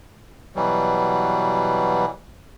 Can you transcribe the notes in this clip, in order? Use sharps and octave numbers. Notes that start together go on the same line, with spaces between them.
B2 E3 F#3 G3